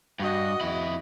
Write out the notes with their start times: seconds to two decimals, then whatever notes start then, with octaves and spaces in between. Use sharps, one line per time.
0.20 G2 F#4 D#5
0.61 F2 E4